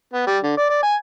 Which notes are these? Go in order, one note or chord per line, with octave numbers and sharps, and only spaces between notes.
B3
G3
D3
D5
D5
G#5